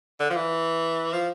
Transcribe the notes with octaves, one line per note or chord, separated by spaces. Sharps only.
D3
F3
E3
F3